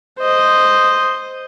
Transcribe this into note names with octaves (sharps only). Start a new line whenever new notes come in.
C5 D#5